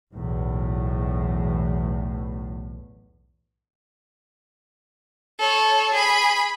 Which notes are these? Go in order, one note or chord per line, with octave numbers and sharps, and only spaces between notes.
B1 E2 A2
A4 C#5
G#4 B5